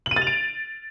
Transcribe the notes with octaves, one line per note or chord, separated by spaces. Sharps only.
F#7
D#7
A6
F7
D7